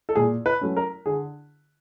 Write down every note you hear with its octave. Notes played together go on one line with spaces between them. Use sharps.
A4
A#2 G#4
B4
F#3 A3 C#4
A#4
D3 G#4